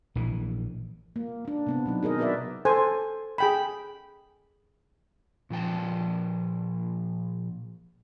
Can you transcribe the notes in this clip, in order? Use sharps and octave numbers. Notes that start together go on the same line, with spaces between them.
A#1 E3
A#3
A#3 D4
C3 B3 C4
B2 F#3 D#4
D#4 G#4 A#4 D#5
B3 F#4 A#4 B4 D5 E5
A4 C5 G#5
G#4 G5 B5
A#2 F3 G5 A5